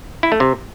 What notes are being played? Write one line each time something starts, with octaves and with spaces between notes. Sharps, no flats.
E4
A3
C3